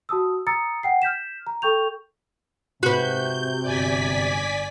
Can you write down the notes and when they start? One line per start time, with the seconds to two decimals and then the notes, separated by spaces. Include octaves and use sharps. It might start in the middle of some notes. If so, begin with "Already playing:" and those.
0.09 F#4 A5 D#6 E6
0.47 A#5 D#6 E6 A6 C#7
0.83 F#5 G5 C7
1.02 F6 G6 B6 E7
1.47 A#5
1.62 A4 G5 C#6 G6 F7
2.83 G#2 C3 F#4 B4 G6
3.63 G1 G#2 D5 G#5 B6